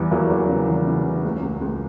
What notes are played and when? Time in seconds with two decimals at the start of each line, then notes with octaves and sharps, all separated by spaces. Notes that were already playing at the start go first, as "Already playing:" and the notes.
Already playing: E2 E3 G3
0.11 E2 F#3 A#3
0.30 E2
0.49 C#3
0.68 E3
0.87 C#3
1.06 C#3
1.24 C#2
1.43 C#2
1.61 C#2